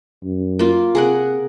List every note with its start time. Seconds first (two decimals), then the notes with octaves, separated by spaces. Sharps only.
0.23 F#2
0.59 A#3 F4
0.95 C3 G#4 A#4 F#5